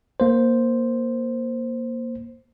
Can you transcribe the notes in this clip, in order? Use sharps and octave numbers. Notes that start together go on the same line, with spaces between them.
A#3 C5